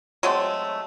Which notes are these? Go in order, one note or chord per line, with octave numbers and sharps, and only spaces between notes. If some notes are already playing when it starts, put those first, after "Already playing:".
F#3 G#3 A3 C4